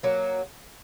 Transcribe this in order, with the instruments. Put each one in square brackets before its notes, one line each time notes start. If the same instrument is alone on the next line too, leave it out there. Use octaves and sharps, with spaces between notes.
[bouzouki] F#3 A#3